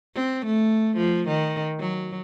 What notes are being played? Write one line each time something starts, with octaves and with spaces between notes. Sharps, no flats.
C4
A3
F3
D#3
F#3